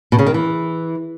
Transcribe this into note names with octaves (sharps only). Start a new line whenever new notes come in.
B2
C#3
D#3
E3